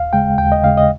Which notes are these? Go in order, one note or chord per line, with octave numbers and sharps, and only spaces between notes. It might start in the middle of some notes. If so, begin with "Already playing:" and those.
Already playing: D#2 F5
C#3 G#3 G5
D#2 G5
D#5
C#3 G#3 F5
D#5